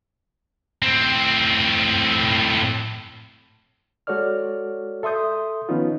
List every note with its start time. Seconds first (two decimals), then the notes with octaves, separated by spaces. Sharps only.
0.83 A2 C4
4.07 G#3 F#4 A4 C#5 D5 F6
5.03 A4 E5 C6 D#6 G6
5.69 D#3 F3 B3 C#4 D#4 F4